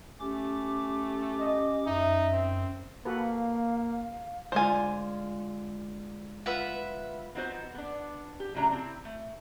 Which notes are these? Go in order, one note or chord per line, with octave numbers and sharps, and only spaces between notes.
A3 C#4 G4 D6
D#5
F#2 D#4 E5
C4
A#3 F#4 A4 B4 F5
D3 G#3 F4 C5 G#5
F4 B4 E5 F#5
B3 C4 D#4 F4 F#4 C5
B3 D4
G4
A2 C#3 F#3 D4 A#5
C4 E4
A3